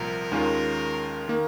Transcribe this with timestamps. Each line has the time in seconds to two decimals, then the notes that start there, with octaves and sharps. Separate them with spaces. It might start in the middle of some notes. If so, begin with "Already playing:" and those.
Already playing: C2 A#2 F3 A#4
0.32 D#2 D#3 G#3 C#4 F4
1.28 D#3 A#3